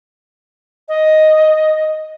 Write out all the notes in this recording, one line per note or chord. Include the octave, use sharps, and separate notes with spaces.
D#5